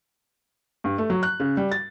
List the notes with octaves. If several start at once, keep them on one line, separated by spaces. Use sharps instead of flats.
G2
A3
F#3
F#6
C#3
G3
A6